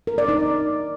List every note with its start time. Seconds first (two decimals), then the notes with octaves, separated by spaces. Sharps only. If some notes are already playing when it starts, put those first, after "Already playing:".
0.07 A#4
0.18 D5
0.29 D#4